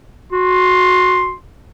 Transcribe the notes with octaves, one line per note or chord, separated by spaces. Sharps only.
F#4 C6